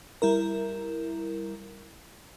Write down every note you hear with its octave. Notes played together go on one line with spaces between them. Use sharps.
G3 E4 A#4